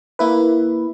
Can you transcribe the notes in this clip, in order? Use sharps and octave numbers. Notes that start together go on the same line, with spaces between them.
A#3 E4 B4